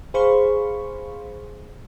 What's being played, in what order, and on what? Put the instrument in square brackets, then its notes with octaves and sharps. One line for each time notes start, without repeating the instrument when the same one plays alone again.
[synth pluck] G#4 C5 F5 B5 C#6